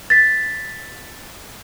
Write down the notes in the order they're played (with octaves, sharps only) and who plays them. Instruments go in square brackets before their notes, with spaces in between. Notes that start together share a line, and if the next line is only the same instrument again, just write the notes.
[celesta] A6 B6